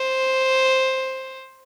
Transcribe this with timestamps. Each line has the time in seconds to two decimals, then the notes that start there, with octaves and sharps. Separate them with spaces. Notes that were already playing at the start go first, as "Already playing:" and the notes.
Already playing: C5